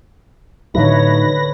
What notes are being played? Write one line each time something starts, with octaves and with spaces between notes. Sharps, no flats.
A2 D3 E3 F#3 D#4 B4 C#5 A#6